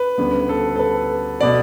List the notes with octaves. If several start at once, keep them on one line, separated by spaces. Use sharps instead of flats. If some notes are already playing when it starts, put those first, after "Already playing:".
Already playing: B4
D2 C#3 G3 B3
A4
A4
B4
B2 A3 D5